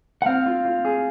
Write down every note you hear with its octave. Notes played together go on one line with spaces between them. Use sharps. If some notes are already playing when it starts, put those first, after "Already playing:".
F#5
C4 F5
F4
F4
G#4